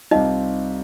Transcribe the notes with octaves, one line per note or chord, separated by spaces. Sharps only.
C2 C3 G3 C4 D#4 F4 D#5